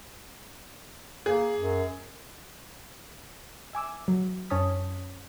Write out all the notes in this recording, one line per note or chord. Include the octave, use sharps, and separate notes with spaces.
A#3 G#4
F#2
E5 G#5 D6 E6
F#3
F#2 C#4 C#5 A5 D#6 B6